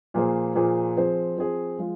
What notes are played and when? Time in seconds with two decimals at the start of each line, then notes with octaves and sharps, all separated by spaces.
0.14 A#2 F3 A#3 G#4 C5
0.55 A#2 F3 A#3 G#4 C5
0.97 F3 C4 G#4 C5
1.37 F3 C4 G#4 C5
1.78 F3 G#3 F4